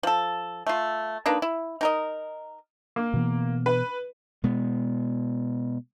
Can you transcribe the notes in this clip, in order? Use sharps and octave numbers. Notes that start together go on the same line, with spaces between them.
F3 A4
A3 F4
A#3 D4 D#4 B4
E4
D#4 A#4 D#5
A#3
B2 E3 B3
B4
B2 G#3 B3